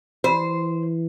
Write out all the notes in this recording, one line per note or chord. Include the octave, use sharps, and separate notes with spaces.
E3 C5